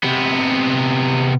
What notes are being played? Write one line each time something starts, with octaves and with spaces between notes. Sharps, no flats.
C3 B3